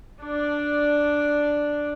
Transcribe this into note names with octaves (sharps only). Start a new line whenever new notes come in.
D4 D5